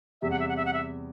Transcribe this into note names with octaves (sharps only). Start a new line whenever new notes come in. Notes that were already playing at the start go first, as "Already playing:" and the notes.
E2 C3 G3 E5
F#5
E5
F#5
E5
F#5
E5